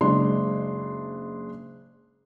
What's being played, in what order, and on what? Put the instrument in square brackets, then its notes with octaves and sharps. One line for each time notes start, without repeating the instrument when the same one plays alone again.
[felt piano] F#1 G#3 D4 C6